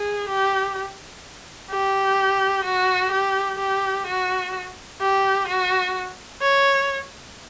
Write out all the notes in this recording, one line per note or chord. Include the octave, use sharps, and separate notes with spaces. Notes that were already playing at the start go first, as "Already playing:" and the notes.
Already playing: G#4
G4
G4
F#4
G4
G4
F#4
G4
F#4
C#5